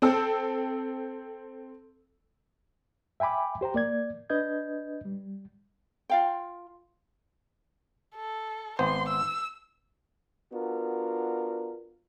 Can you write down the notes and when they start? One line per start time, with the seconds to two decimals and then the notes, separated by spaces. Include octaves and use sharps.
0.02 C4 A4 E6
3.20 E5 G5 G#5 B5 D6
3.61 G4 C5 G5 A#5
3.74 A#3 D5 G#6
4.30 D4 B4 D#5 G6 G#6
5.05 G3
6.10 F4 F5 G5
8.15 A4
8.79 G#1 B3 C5 C6
9.08 E6
10.53 B3 D4 F4 F#4 A#4